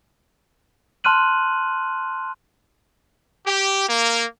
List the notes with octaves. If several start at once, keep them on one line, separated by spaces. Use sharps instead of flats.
A5 C6 F6 F#6 D#7 F#7
G4
A#3